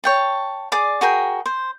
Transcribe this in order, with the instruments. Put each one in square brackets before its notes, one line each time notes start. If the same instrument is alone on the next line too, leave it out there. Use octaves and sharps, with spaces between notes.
[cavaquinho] C#5 G5 A5
G#4 D5 D6
F#4 G#4 A#4 G5
C5